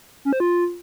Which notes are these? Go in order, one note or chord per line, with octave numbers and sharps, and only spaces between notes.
C#4
C5
F4